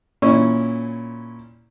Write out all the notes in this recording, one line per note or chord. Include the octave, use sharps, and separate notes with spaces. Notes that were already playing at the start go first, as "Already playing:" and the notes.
A#2 C#4 E4 C#6